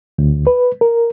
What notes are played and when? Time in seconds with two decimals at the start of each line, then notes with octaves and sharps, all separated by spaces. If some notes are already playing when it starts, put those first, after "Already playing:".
0.18 D2
0.47 B4
0.81 A#4